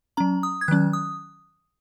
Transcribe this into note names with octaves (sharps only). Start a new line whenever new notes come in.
F#3 C#4 A#5
D#6
G#6
D#3 F#3 C#4 F#6
D#6